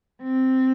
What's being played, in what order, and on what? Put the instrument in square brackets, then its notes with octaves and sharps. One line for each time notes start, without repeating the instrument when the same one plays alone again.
[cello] C4